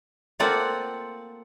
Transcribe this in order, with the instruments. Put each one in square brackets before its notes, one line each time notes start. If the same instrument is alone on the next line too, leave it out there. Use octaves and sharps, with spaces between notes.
[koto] A3 A#3 C4 F4 D5 F#5